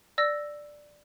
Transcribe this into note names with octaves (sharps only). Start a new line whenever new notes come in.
D5 E6 A#6